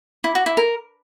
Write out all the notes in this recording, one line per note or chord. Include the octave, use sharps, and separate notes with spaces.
E4
F#4
E4
A#4